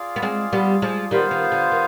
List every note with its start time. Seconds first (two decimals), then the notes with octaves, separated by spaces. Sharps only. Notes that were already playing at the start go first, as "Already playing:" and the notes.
Already playing: F4 G#4 D5 F5
0.16 B3
0.22 G#3 C4
0.53 G3 B3
0.82 F3 G#3
1.11 D#3 G3 B3 F4 C5 F5
1.31 D#3
1.52 D3
1.72 D#3